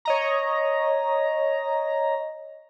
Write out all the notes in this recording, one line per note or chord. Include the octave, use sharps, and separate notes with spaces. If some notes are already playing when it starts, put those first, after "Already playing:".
C#5 D#5 A#5